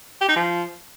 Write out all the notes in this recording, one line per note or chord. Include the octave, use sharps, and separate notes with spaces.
G4
D#4
F3